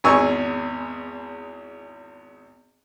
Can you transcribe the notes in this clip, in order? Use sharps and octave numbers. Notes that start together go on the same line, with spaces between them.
G#1 E2 G#5 C#6 E6